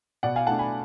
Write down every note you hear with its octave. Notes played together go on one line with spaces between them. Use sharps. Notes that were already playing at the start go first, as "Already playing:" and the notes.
B2 D5 F#5
F5 G#5
A3 D4 F#5 A5
G#5 B5